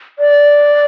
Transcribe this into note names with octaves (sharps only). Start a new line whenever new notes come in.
D5